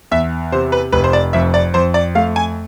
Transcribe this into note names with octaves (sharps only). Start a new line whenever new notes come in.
E2 E5
C3 C5
B4
F1 B4
C5
D5
F2 E5
D5
F2 C5
D5
A3 F5
G#5